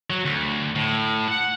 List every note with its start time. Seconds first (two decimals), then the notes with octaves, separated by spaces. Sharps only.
0.10 F#3
0.25 D2
0.75 A2
1.28 F#5